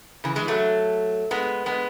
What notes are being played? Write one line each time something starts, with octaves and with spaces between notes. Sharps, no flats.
C#3 E3
E3 G#3
F#3 A3
G#3 B3
G#3 B3